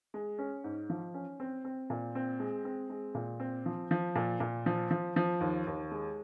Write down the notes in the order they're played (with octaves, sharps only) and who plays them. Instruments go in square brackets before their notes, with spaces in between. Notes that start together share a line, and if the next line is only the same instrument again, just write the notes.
[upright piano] G#3
C#4
G#2
F3
C#4
C4
C4
A#2
C4
G#3
C4
G#3
A#2
C4
F3
F3
A#2
A#2
F3
F3
F3
D#2
D#2
G#3